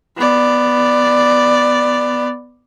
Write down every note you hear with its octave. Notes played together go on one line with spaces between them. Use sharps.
B3 D5